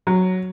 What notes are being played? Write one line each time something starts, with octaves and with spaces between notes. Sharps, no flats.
F#3